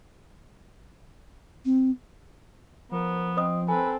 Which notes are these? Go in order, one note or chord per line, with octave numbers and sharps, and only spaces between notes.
C4
F3 B3 A#4
C4 C5 D#5 D#6
C4 A4 B4 G#5